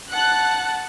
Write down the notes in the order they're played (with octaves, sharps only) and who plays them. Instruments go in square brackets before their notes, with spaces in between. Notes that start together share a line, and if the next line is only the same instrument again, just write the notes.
[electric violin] F#5 A5 [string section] F#6